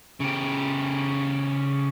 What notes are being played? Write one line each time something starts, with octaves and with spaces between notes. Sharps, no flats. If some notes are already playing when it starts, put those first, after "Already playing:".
C#3 G4